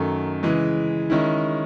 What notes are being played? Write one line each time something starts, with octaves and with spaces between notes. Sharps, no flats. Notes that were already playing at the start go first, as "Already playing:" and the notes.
Already playing: F#2 D#3 A3
C#3 E3 G#3
D#3 G#3 C#4 E4